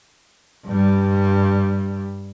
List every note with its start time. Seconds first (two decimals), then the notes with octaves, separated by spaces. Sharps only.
0.66 G2 G3